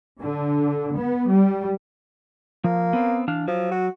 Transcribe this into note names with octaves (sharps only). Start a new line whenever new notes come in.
D3
B3
G3
F3 A#3
B3 C4
E3 D4 F5
F3 F#3
F#4